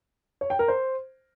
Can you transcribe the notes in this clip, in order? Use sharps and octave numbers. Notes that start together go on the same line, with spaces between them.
C#5
G5
A#4
C5